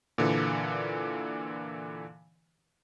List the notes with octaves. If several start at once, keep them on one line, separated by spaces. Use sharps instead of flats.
A#2 D3 E3